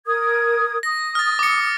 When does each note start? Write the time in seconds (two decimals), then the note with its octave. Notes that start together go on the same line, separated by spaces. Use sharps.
0.06 A#4 D#6 G#6
0.83 D#6 A#6
1.15 F6 A6
1.39 D6 C#7